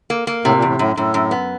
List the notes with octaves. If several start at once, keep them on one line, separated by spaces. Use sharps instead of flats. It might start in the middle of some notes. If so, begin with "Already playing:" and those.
A#3
A#3
A2 C3
A#2
E2
A2
F#2 A2
F#2 A2
F#2
B3